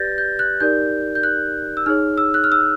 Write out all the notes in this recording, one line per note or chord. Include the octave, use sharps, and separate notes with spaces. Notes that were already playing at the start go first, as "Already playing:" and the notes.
Already playing: G4 B4 D5 G6 A6 A#6
G6
F#6
D#4 G4 A#4 D5 G6
G6
F#6
E6
D#4 G#4 C#5 F6
E6
F#6
F6
E6